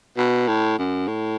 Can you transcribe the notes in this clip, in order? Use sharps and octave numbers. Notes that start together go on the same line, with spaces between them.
B2
A2
F#2
A2